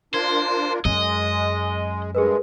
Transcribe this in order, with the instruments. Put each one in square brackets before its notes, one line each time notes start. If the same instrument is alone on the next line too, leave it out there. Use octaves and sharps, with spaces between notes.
[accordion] D4 F4 A#4 [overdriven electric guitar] C5 [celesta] G#6
[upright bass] F#2 [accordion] G#3 [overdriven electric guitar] D#5
[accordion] G2 G#3 [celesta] G#4 A#4 B4